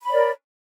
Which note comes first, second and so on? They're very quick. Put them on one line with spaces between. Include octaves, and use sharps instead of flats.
B5 C#5 D5 A#4